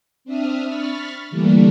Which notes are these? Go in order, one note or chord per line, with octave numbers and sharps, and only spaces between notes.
C4 D4 E5 D#6 F6
B5 C#6 F6 A6 B6
D3 E3 G3 A3 A#3 D4